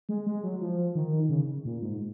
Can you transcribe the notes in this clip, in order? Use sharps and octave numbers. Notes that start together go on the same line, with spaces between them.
G#3
G#3
F#3
F3
D#3
C#3
A#2
G#2